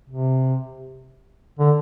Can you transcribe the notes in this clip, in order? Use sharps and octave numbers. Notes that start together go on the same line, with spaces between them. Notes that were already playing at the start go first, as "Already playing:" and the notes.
C3
D3